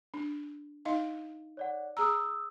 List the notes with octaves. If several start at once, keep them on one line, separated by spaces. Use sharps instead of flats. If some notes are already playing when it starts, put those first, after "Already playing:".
D4
D#4 D#5 F5
C#5 D5 F#5
G#4 A#5 D#6 E6